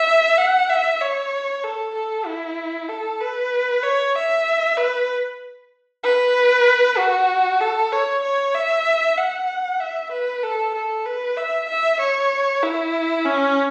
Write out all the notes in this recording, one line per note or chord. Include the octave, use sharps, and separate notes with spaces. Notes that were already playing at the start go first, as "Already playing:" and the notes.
Already playing: E5
F#5
E5
C#5
A4
A4
E4
A4
B4
C#5
E5
B4
B4
F#4
A4
C#5
C#5
E5
F#5
E5
B4
A4
A4
B4
E5
E5
C#5
E4
C#4